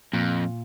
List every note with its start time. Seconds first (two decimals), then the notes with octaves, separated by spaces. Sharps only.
0.13 F2 A#2